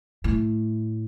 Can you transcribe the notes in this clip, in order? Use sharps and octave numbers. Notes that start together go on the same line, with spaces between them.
A2